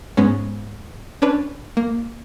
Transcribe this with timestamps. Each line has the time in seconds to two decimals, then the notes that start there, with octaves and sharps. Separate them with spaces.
0.17 G#2 G#3 B3 C#4
1.22 C#4 D4 B4
1.77 A#3